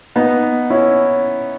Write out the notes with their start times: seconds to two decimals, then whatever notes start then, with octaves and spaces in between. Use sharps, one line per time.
0.16 B3 D#4
0.70 C#4 E4